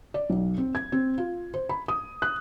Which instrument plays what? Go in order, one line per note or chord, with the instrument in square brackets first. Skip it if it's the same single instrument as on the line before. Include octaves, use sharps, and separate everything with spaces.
[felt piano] D5
B1
C4
G#6
C4
F4
C5
B5
D#6
F#6